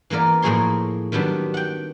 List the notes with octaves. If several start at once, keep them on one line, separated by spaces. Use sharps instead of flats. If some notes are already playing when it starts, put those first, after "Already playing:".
E3 A#3 B3 A#4 D5
A2 F3 A#3 G#4 C#5 C6
D#3 F#3 G3 B3 D4
F#5 G5